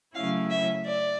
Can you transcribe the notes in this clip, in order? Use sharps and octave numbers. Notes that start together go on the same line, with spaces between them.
C#3 F#3 A3 C#4 E4 F5
E5
D5